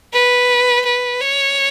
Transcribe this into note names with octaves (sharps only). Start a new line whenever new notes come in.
B4
B4
C#5